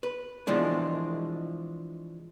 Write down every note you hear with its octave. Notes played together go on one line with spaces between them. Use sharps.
B4
B2 E3 F3 G#3 D4